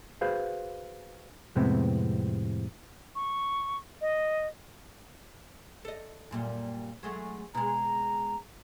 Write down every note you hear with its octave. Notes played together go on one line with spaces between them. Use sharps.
F#4 G#4 B4 C5 F5
F2 A2 C3 G#3 B3 C4
C#6
D#5
A4 D#5
F#2 A#2 G3
F#3 G#3 A3
B2 G#3 A#5